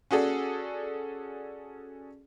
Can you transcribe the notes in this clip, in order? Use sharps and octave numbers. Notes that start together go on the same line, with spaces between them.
C#4 F#4 G#4 A4 D5